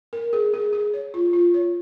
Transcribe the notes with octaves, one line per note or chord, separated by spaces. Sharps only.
A#4
G#4
G#4
G#4
C#5
F4
F4
C#5